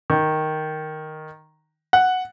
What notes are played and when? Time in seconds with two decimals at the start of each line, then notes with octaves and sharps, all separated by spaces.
0.10 D#3
1.93 F#5